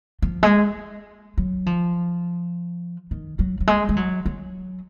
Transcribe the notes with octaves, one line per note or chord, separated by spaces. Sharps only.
F3
G#3
F#3
F3
D#3
F#3
F#3
G#3
G#3
F#3
F#3